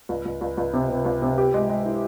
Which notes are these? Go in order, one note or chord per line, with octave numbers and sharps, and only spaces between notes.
C#2
C#2
C#2
C#2
C3
C3
C#2
C3
G4
G#3
G#3
E4